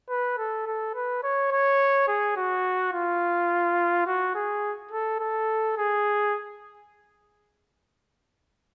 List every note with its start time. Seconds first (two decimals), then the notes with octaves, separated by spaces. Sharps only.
0.10 B4
0.38 A4
0.67 A4
0.95 B4
1.23 C#5
1.52 C#5
2.08 G#4
2.37 F#4
2.93 F4
4.07 F#4
4.35 G#4
4.91 A4
5.20 A4
5.77 G#4